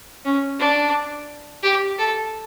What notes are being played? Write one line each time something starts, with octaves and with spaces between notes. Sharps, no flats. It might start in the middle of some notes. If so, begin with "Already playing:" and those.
C#4
D4
G4
A4